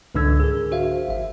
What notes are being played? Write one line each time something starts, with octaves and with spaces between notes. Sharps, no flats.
C#2 G#2 D3 D4 E6 G#6
G#4 A#4
F#4 C5 E5 F5
G#1 E5